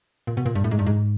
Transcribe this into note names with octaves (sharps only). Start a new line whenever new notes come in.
A#2
B2
A#2
G2
A2
G#2
G2
G#2